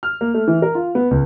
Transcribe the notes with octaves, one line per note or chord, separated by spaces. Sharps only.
F6
A#3
A3
E3
A#4
F4
B3
C#2